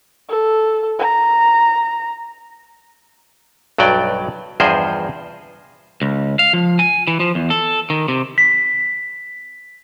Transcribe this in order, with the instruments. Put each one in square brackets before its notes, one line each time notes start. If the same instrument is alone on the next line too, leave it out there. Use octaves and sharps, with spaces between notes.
[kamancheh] A4
A#5
[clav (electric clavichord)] B1 G2 F#3 D5 G5
E2 G2 F3 G#4 C5 D#5
[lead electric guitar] C#2
F5
F3
G#5
E3
F3
E2
A4
D#3
C3
[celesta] B6